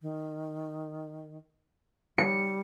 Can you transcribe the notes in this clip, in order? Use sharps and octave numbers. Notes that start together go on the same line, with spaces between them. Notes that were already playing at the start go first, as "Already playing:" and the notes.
D#3
G3 C#7